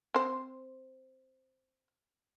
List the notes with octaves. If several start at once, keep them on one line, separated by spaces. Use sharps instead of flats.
C4 C5